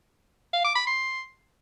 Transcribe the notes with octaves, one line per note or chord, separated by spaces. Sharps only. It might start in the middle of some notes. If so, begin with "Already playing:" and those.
F5
D6
B5
C6